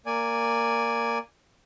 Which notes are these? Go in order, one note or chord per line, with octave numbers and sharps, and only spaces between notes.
A#3 D5 G#5